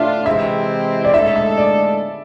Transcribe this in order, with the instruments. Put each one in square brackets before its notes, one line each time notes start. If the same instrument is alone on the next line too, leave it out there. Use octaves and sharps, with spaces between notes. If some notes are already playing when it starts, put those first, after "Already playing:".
Already playing: [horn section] A2 D4 F4 [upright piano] E5
[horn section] C3 E3 G#3 C4 E4 [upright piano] E5
[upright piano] D5
[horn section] A2 G#3 D4 A4 [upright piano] E5
[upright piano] E5
D5